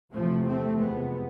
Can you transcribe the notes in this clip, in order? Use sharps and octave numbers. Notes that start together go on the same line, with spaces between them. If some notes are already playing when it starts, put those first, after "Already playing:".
E2 C3 F3 A3
A3 C4
F2 C3 G#3 B3